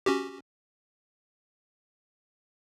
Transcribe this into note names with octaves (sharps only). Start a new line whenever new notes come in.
C#4 F#4 G4